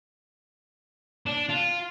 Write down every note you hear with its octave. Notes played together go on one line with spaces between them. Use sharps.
D4
F4